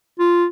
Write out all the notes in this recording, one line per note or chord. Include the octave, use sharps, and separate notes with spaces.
F4